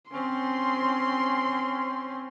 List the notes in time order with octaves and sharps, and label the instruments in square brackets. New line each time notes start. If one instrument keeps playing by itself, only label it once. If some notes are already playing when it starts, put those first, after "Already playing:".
[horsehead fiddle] C4 C#4 [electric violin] C6